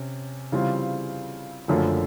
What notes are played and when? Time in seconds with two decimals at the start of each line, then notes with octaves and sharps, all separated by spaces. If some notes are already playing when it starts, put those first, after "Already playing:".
Already playing: C3 C#4
0.52 C#3 E3 G3 C4 F4
1.68 F#1 F#2 D3 F3 A3